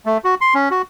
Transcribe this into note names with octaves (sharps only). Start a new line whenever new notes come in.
A3
F#4
C6
C#4
F#4